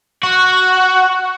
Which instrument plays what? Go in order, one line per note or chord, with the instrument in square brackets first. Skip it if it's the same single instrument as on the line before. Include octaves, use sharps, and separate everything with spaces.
[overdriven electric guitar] F#4